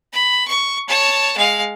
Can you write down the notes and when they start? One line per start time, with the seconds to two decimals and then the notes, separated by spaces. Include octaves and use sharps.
0.13 B5
0.48 C#6
0.88 C#5 A5
1.37 G#3 F5